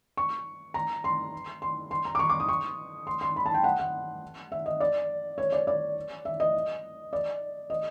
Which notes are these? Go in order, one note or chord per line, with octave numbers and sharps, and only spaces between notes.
C#6
A#5
C6
C6
C6
A#5
D6
C#6
D6
D#6
C#6
C6
C6
B5
A5
G5
F#5
F#5
E5
D#5
D5
C#5
D5
D5
E5
D#5
D5
D#5